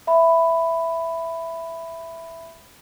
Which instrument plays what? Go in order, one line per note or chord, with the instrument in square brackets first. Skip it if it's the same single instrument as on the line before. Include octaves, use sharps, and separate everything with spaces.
[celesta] E5 B5